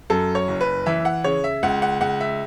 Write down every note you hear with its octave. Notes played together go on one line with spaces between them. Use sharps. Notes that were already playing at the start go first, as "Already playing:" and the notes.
F#2 A4
C#5
F#1
B4
E3 E5
F#5
C#3 C#5
E5
C#2 F#5
F#5
C#2 F#5
E5